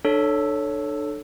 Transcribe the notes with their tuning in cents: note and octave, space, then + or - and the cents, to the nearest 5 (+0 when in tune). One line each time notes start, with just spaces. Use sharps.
D4 +35 A4 +0 C#5 +0